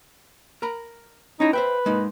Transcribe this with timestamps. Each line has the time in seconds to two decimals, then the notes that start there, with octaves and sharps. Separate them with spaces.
0.62 A#4 A#5 B5
1.40 C#4 D#4 E4
1.53 B4 C5 E5 G5
1.86 G#3 A#3 D#4